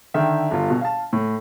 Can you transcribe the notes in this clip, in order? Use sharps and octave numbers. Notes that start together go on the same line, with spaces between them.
D3 D#3 E5 G5
G1 F4
B2
F5 A5
A2